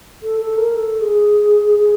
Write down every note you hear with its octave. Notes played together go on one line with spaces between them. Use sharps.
A4
A4
A#4
A4
G#4
G#4